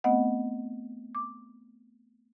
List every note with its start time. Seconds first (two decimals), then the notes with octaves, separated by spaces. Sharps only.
0.04 A3 B3 C4 D#5 F#5
1.15 D6